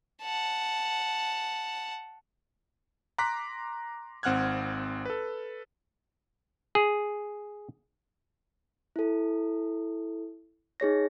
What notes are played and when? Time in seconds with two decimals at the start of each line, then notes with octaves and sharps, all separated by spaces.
0.23 F#5 A5
3.18 A#5 C6 D6 F#6 A#6 B6
4.23 G#1 C4 F#5 F6 F#6 G#6
5.05 A4 B4
6.75 G#4
8.96 E4 A4
10.80 D#4 G#4 C#5 A#6